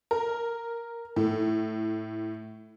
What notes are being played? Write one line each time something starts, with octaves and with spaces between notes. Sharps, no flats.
A#4
A2